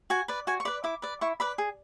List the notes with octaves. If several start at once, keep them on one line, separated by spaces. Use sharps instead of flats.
F#4 G#5
B4 D5
F#4 G#5
C#6
B4 D5 B5
E4 D6
B4 D5
E4 C#6
B4 D5 B5
G#4